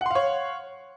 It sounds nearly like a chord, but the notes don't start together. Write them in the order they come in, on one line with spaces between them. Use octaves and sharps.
F#5 C6 F5 C#5